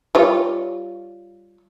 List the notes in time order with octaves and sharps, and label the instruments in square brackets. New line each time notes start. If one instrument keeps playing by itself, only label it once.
[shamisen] G3 F4 C#5